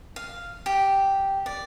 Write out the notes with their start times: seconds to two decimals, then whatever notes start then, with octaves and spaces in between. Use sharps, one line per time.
0.16 F5
0.66 G4
1.46 D5